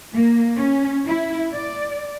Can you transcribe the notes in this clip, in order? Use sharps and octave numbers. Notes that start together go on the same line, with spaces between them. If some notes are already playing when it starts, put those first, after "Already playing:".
A#3
C#4
E4
D5